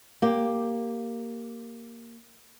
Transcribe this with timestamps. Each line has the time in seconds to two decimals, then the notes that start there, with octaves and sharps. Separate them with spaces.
0.22 A#3 G4